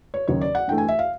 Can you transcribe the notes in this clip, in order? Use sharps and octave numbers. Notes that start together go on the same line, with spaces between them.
C#5
D#2 C#3 F#3 C#5
D5
F#5
G2 E3 A3 G5
G#5
E5
F5